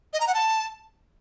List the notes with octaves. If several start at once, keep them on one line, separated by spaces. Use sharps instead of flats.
D#5
A#5
F#5
A5